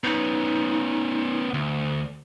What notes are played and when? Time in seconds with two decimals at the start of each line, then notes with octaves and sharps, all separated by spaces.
0.04 B3 C#4 D#4
1.54 D2